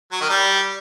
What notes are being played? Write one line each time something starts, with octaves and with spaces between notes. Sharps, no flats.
F#3
D#3
G3